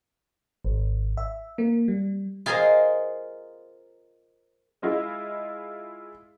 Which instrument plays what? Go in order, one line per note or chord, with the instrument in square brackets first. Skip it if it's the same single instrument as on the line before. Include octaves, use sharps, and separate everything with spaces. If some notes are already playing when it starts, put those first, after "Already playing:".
[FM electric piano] G#1
E5
A#3
G3
[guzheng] F4 G#4 A#4 C5 D#5
[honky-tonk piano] G#3 E4 F4 G#4 D#5